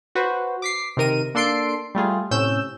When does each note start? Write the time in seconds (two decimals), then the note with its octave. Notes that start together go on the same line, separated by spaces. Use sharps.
0.15 F#4 B4 C5
0.62 D6 B6 C7
0.97 C3 D#3 A#4 D#7
1.35 A#3 D4 A4 C6 C7 D7
1.95 G3 A3 F4 G#4
2.31 A2 C3 C#4 E6 G6 E7